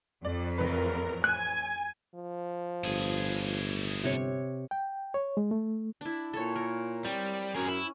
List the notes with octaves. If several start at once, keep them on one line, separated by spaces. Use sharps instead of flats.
F2 D5
A1 A#4 B4
G#5 F#6
F3
G1 A2 G#4
C3 C#5
G5
C#5
G#3
A3
D4 E4
A#2 A4 C#5
A#4
G3 C4
F#2 C#4 G#4 A#4
E4